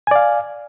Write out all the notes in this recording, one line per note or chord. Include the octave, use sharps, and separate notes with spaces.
D5 F5 G#5